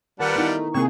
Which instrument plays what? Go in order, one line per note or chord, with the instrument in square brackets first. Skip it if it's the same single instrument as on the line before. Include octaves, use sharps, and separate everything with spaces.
[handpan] D#3 A#4 [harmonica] G3 D4 F4 [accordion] B4 F#5 A5
[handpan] B3 D#4 E4
[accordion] A3
[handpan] C3 A#3 [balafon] C4 A#4 [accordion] G#4 [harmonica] C#6